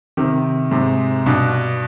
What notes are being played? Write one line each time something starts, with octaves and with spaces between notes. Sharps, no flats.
C3 D#3
G#2 C3
G2 B2